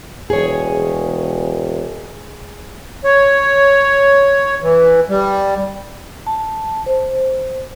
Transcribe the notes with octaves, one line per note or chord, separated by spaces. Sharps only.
E1 G#4 C#5
C#5
E3
G3
A5
C5